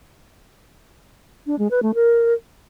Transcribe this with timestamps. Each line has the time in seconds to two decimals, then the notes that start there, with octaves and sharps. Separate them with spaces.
1.46 D4
1.58 G#3
1.70 B4
1.82 A3
1.94 A#4